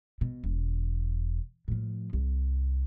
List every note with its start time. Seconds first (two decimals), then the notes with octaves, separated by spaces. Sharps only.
0.21 B2
0.44 E1
1.68 A2 F3
2.13 C2